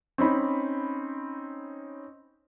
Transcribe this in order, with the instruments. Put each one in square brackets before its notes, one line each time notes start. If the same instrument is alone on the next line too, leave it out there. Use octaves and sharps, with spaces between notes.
[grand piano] C4 C#4 D#4 B5